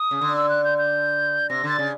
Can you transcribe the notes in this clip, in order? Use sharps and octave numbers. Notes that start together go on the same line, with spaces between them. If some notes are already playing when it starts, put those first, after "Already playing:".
Already playing: D#6
C#3
D3
E6
F#6
G6
G6
C3 A#6
D3 A6
C#3